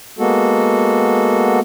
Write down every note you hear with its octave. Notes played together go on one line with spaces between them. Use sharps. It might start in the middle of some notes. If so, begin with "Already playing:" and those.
G#3 A#3 B3 F#4 A4